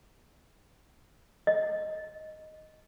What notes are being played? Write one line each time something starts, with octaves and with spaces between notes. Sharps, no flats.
D#5